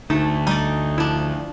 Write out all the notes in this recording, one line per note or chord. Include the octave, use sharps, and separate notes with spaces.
D2 A3 D#4
G3 D#4 D5
F3 D4 E4